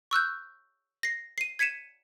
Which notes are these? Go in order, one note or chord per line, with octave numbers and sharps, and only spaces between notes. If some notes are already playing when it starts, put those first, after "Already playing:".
C#6 E6 F#6 G6
A#6 C7
C7 D#7
G#6 B6 C#7 D#7 E7